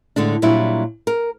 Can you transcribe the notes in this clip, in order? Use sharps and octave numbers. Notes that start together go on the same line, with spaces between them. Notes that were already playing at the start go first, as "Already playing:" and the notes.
A2 D3 G#3 D4
A#2 F#3 G3 D4 E4
A#4